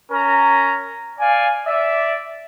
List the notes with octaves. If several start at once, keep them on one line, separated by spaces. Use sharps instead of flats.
C#4 A#4 A#5
D5 F5 G#5
D5 E5